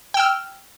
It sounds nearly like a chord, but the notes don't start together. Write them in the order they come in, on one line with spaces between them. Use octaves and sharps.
G5 E6 F6